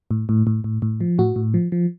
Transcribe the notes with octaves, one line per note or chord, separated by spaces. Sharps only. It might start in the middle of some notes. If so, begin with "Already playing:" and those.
A2
A2
A2
A2
A2
F3
A2 F#4
A2
F3
F3